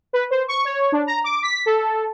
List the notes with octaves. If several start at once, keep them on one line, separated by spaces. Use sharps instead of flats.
B4
C5
C#6
C#5
D4
A#5
D6
B6
A4